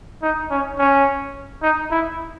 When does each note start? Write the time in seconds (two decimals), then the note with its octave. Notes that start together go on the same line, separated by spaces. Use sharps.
0.23 D#4
0.51 C#4
0.79 C#4
1.62 D#4
1.91 E4